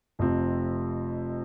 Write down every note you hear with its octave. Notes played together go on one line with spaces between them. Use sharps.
F1 F2 C3 F3 C4